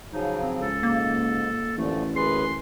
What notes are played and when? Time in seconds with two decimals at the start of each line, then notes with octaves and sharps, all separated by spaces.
0.12 C#3 F3 F#3 D#4
0.42 C4
0.61 C#2 A4
0.83 G#2 A#3
1.78 A1 A#2 D3 F3 A3
2.16 F#2 G#4 B4 C6